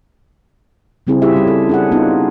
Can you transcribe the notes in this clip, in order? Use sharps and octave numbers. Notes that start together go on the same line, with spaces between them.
C#3 G3 C4 E4 G#4
G3 E4 F4 G4 G#4 E5
G3 C#4
A4
D4 G#4 F#5
B3 C#4 D#4 F4